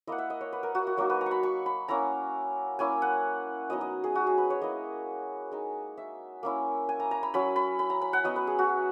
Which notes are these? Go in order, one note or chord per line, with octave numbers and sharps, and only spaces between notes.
A#3 E4 D#5 F#5
E5
D#5
C#5
B4
A#4
F#4
F#4
F#3 A#3 D#4 F#4
B4
A#5
C#6
B5
C#6
B5
A#3 C#4 E4 A#5
A#3 C#4 E4 G#5
F#5
F#3 B3 D#4 D#5
D#5
G#4
F#4
G#4
B4
C#5
A#3 E4 D#5
G#3 D#4
E5
A#3 C#4 E4
G#5
A#5
A#5
B5
F#3 C#4 E4 B5
B5
B5
A#5
B5
F#5
F#3 B3 E4 D#5
B4
G#4
F#4